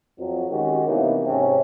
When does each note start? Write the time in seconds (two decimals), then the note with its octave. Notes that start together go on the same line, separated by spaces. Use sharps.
0.19 F2 F#3
0.51 D#3 G#3 C#4 F#4 G4
0.88 C3 E3 A#3 B3 D#4
1.26 G#2 C3 C#4